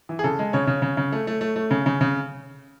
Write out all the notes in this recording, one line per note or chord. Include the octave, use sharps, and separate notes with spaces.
E3
G#4
C#3 A4
G#3
C#3 C#5
C#3
C#3
C#3
A3
A3
A3
A3
C#3
C#3
C#3